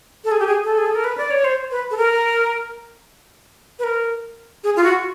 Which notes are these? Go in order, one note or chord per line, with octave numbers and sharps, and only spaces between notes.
A4
G#4
G4
G#4
A4
G#4
A4
A#4
B4
D5
C#5
C5
B4
A4
A#4
B4
A#4
G#4
F4
F#4